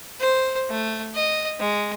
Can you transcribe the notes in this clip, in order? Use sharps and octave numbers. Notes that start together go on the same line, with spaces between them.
C5
A3
D#5
G#3